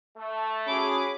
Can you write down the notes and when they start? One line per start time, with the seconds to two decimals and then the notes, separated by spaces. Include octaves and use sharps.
0.17 A3
0.68 C#4 F#4 G#4 B5 D6